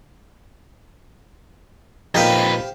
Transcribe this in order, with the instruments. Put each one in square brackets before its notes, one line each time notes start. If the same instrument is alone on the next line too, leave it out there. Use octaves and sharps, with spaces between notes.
[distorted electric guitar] F2 B4 [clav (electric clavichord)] A#2 D#4 [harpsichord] G4 C5 F5